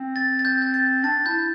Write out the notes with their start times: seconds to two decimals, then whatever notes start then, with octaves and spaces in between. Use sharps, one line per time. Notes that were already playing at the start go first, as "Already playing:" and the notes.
Already playing: C4
0.16 A6
0.39 A6
0.45 G6
0.62 G6
0.74 A6
1.04 D4 A6
1.26 E4 G6